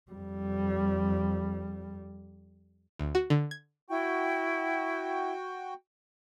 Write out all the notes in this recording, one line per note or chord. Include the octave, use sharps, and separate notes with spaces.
F2 G3
D2
F#4
D3
G#6
E4 F#4 G5